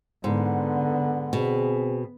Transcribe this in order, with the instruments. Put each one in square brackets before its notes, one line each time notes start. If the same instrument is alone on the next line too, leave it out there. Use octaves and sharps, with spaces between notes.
[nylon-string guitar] G#2 [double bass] D3 B3
[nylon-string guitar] B2 [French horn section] C4 G#4